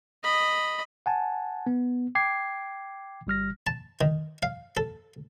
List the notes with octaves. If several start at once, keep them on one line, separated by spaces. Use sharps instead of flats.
D#5 B5
F#5 G#5 A5
B3
G5 D6 G#6 C7
G1 G3 F6 A#6
A5
D#3
F5
A4